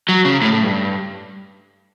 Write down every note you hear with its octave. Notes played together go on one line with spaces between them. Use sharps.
F#3
C#3
A2
A2
G2